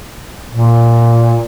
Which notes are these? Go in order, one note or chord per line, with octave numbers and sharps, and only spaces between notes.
A#2